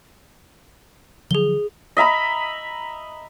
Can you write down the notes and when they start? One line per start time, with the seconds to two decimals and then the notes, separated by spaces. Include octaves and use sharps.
1.31 D3 F3 F#3 G#4 G7
1.97 D#5 E5 A#5 B5